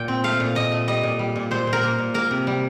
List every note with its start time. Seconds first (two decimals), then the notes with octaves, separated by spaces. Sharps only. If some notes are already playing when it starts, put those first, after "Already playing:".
Already playing: A#2 G5
0.08 C4
0.24 A3 F5
0.40 A#2
0.55 A#2 D#5
0.72 A3
0.87 G3 D#5
1.03 A#2
1.19 G3
1.36 A#2
1.51 A#2 C5
1.67 A#2
1.73 A#4
1.83 A#3
1.99 A#2
2.14 A#3 A#4
2.31 C3
2.47 G3